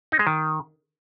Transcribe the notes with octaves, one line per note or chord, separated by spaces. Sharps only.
D#4
G#3
D#3